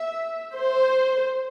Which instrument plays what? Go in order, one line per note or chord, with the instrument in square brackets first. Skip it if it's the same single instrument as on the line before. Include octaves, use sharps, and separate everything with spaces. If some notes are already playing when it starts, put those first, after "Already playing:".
Already playing: [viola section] E5
C5